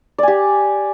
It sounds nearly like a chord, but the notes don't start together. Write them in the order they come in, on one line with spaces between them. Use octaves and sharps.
D5 G#5 G4